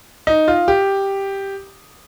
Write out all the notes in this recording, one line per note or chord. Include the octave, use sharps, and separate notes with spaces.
D#4
F4
G4